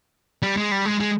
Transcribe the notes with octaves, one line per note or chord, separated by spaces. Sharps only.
G3
G#3
G3
G#3
G#3